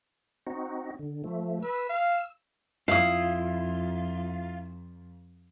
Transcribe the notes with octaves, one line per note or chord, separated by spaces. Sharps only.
C4 D#4 F#4
D3
F3 A3
B4 E6
F5
F2 E4 F4 F5 D#6